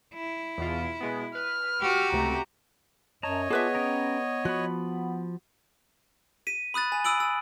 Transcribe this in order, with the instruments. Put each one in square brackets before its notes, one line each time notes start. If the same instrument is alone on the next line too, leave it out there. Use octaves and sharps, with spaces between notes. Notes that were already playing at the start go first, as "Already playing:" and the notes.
[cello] E4
[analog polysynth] E2 B2 F4
B2 G#3 B3
[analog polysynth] B4 [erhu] F6
[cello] F#4 G4
[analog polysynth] C#2 C3 A3 [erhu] A#5
[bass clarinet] F#2 [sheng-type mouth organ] C#5 D#5 [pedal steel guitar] A5 A#5
[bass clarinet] B3 [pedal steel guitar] F4 A5 D6 [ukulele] G#4 B4 E5
[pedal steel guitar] C#4 G5 A#5
[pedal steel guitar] F3 B5 [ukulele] F#4
[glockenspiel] B6 D#7
B5 D#6 F#6 A6
G#5
B5 D#6 E6 D7 F#7
E6